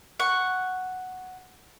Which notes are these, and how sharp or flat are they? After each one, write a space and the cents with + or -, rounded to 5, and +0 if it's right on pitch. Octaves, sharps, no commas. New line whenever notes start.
F#5 +0 C#6 +0